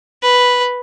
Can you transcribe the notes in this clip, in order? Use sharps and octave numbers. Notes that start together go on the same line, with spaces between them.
B4